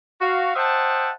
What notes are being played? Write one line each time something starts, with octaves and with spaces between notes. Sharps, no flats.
F#4 F5
C5 D#5 E5 F#5 G5 A5